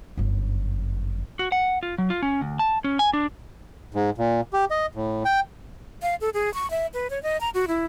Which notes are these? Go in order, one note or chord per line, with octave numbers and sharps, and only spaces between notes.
G1 F#2
F#4
F#5
F4
F#3
F4
C#4
D2
A5
C#4
G#5
D4
G#2
A#2
G4
D#5
A2
G5
F5
A4
G#4
C#6
E5
B4
C#5
D#5
A#5
F#4
E4